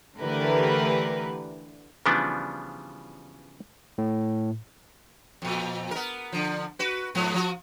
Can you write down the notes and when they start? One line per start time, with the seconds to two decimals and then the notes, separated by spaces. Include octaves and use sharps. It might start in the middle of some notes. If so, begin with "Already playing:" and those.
0.18 D3 E3 A3 G4 A#4 B4
2.06 C#3 E3 F3 G3 B3 D4
3.98 A2
5.42 F2 A#2
5.91 B3 A#4
6.32 D3 F3
6.79 F#4 B4
7.15 G#2 F3 B3
7.34 F3 F#4